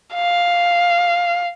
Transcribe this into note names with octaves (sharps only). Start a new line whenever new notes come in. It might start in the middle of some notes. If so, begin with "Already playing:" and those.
F5